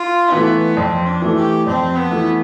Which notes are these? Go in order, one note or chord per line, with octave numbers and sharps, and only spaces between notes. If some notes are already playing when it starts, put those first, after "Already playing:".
Already playing: F4
E3 A3 B3
F2 C4
D4
E3 A3
G4
F2 C4
B3
E3 A3